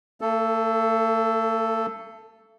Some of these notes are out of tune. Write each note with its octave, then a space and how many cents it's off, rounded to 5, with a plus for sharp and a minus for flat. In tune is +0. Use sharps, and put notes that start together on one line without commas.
A3 +45 A4 +0